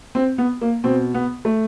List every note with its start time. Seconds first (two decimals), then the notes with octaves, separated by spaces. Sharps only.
0.15 C4
0.38 B3
0.61 A#3
0.84 B2 C4
1.14 B3
1.45 A3